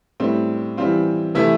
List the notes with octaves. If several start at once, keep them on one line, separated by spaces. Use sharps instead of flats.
A2 G3 C4
E3 G3 C4 F4
C3 E3 A3 E4